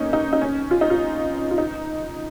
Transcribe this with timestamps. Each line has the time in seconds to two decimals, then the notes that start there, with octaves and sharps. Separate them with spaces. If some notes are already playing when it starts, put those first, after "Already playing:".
Already playing: A#3 C#4 D#4
0.13 D#4
0.33 D#4
0.41 C#4
0.71 F4
0.81 D#4
0.90 F4
1.51 F4
1.58 D#4